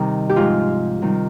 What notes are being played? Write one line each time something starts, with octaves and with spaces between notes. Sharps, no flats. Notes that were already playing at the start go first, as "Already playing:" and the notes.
Already playing: C3 D#3 G3 D#4
G4
G#2 F3 G#3 F4
C3 D#3 G3